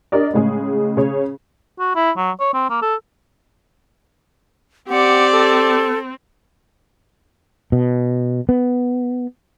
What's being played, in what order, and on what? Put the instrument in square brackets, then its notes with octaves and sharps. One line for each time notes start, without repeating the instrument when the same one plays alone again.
[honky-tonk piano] D4 G4 A#4 D5 D#5
A2 C#3 G#3 G#4
C#3 G#4 C#5
[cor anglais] F#4
E4
F#3
C#5
C4
A#3
A4
[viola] C4 [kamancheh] G4 D5 [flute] F#5
[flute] A4
[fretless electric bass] B2
B3